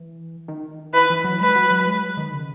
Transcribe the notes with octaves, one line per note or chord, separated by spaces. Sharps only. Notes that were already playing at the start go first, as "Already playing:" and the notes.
Already playing: E3
D#3
E3 B4
E3
F#3
G#3 B4
F#3
F#3
G#3
F#3
D#3
C#3